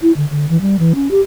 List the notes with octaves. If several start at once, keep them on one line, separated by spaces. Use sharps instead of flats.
E4
D3
D3
E3
G3
E3
C#4
G4